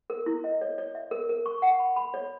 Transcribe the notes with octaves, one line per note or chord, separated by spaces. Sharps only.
A#4
E4
D#5
C#5
C#5
E5
A#4
A#4
C#6
F#5
B5
B5
C#5